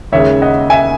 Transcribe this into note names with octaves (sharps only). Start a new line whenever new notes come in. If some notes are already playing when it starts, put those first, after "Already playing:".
D#2 C#3 G#3 C#5 E5
D#5 F#5
E5 G#5